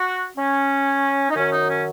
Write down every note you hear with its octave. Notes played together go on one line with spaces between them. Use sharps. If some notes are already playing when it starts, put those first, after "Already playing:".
Already playing: F#4
C#4
D#4
F#2 D#3 F#3 C#4
D#4
C#4